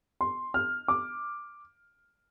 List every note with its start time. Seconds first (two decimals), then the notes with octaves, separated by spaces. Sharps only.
0.21 C6
0.54 F6
0.88 D6